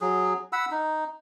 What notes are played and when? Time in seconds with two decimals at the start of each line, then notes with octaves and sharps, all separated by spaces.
0.01 F#3 G#4
0.53 F#5 B5 E6
0.71 D#4